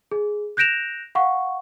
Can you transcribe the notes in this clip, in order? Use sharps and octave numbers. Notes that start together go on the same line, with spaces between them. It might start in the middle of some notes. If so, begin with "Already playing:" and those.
G#4
F#6 G6 A#6 D7 E7 F7
F5 F#5 C#6